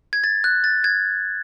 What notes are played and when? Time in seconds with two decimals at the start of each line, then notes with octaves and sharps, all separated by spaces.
0.13 G#6
0.24 A6
0.44 F#6
0.64 A6
0.84 G#6